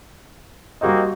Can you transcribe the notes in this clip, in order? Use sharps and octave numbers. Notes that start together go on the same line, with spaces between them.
G3 A#3 C4 D#4 F#4 D#5